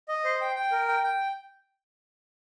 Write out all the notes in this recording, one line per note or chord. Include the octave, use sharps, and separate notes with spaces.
D#5
C5
G5
G5
A#4
G5
G5